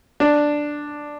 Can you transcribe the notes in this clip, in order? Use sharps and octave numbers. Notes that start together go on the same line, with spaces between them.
D4